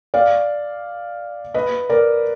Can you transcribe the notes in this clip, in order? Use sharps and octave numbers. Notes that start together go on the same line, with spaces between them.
D5 F5
B4 D#5
A#4 D5